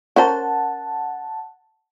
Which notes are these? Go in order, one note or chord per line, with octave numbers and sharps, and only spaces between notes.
C#4 A#4 C5 F#5 A5